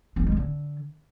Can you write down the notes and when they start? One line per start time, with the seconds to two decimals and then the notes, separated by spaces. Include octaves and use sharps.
0.16 C4
0.21 G2
0.26 G#3
0.32 E3
0.37 D3